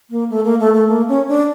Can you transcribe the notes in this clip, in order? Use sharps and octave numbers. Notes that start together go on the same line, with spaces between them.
A#3
A3
A#3
A3
A3
A#3
C#4
D4